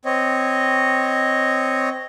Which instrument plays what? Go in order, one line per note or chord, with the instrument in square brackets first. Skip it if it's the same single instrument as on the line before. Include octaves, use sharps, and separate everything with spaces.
[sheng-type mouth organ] C4 C#5 D#5